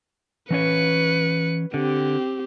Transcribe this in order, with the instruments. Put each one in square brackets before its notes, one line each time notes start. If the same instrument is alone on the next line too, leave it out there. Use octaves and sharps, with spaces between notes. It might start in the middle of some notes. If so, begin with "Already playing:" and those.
[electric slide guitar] E3 C#4 C#5 [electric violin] B4 C#7
[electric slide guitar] D3 [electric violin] C4 G4